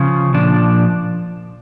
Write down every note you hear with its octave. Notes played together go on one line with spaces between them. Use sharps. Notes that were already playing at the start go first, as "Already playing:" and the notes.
Already playing: C#3 F3
A#2 F3 D4